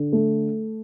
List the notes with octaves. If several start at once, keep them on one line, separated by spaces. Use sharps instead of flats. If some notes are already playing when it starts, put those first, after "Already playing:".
Already playing: D3
A3